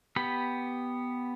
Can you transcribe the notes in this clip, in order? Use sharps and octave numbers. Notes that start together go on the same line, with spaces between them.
B3 G4 B5